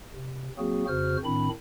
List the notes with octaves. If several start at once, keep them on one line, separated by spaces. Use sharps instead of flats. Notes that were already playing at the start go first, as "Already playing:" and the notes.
C3
F#3 A#3 C4 F#4 G#4
F2 C#3 F#4 C5 F6
A2 D#3 C4 D4 B5